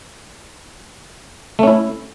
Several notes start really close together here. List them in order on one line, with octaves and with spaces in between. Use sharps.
A3 C#4 E4